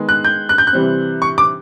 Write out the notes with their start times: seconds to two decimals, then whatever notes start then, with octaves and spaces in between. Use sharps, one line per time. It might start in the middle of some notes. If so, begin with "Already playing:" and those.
Already playing: D#3 G#3 B3
0.09 F#6
0.24 G6
0.49 F#6
0.58 G6
0.67 F#6
0.73 C3 E3 G3 C4
1.22 C#6
1.38 D6